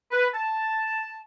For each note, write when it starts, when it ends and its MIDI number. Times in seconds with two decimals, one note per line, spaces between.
0.11 0.27 71
0.34 1.22 81